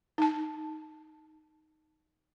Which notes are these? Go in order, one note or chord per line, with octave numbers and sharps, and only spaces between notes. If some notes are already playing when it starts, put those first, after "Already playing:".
D#4 A5